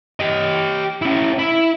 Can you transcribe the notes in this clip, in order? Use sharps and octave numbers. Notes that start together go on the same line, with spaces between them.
G4 D#5
C#4 E4
E4